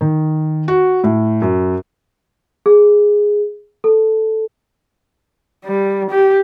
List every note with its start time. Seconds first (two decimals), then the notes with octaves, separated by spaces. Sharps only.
0.01 D#3
0.68 F#4
1.04 A2
1.42 F#2
2.66 G#4
3.84 A4
5.66 G3
6.10 G4